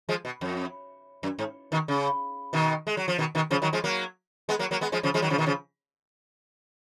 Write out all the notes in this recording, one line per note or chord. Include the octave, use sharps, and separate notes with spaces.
F3 G#3
B2
F2
F#2
G#2
B2 D#3
C#3
B2 D#3
G#3
F#3
F3
B2 D#3
B2 D#3
C#3 F3
D#3 F#3
F3 G#3
F#3 A#3
G#3 B3
F#3 A#3
F#3 A#3
G#3 B3
F3 G#3
C#3 F3
F3 G#3
D#3 F#3
C#3 F3
B2 D#3
C#3 F3